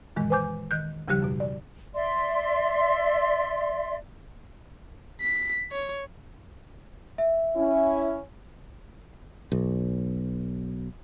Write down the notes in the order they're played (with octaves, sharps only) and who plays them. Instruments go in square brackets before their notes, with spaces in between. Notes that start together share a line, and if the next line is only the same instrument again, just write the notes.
[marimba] F#2 A#2 D#3 E3 G#3
B4 C5 G#5 D6 G6
D#3 F#6 G6
D#2 C#3 F3 G3 G4 F#6
F#2 B2
D5
[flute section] D5 E5 C6
[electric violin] B6
C#5
[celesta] E5
[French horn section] C#4 E4
[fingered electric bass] B1